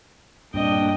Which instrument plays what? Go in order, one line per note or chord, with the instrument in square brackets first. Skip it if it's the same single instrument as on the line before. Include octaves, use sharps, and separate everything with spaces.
[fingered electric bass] G2 A#2 C4 [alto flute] D4 [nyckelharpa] D#5 G5